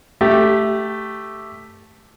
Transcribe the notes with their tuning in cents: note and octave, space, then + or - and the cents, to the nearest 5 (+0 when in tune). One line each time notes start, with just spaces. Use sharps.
A3 +0 G4 +0